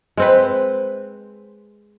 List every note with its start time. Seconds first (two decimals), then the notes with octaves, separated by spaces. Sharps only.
0.17 G#3 C4 B4